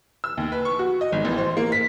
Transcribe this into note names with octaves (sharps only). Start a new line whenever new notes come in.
E6
D#2
B4
C#6
F#4
D#5
G#1
A1
C5
A#3
B6